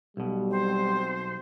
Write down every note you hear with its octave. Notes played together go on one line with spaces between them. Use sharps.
B1 B2 G3
C4 C5